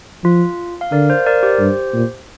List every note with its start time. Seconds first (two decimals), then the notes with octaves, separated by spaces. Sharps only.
0.24 F3 F4
0.81 F5
0.92 D3 A#4 D5
1.09 C5 F5
1.26 A#4 D5
1.43 G4 C5
1.60 G2
1.94 A#2